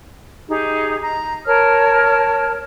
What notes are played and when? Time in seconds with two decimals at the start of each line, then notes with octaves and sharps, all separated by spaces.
0.48 D#4 G4 G#4
1.00 A#5
1.46 A#4 C#5 A5 F6